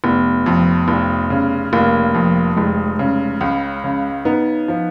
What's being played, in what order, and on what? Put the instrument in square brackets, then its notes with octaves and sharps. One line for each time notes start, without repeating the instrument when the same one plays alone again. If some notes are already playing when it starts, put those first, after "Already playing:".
[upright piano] F1 [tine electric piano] B3
[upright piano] F2
F1
C#3
[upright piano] F1 [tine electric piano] A#3
[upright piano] F2
[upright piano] F1 [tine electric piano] G#3
[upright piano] C#3
C#2
C#3
[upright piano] B3 [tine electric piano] D#4
[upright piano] F3